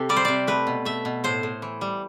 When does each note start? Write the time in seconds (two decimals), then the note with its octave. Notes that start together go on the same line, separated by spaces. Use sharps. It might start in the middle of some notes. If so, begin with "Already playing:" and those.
Already playing: C3 G4 A4
0.09 G3 D5
0.17 C5
0.25 C3 D5
0.47 A3 B4
0.67 B2
0.85 A3 E5
1.05 B2
1.24 A2 C5
1.43 A2
1.62 E3
1.81 G3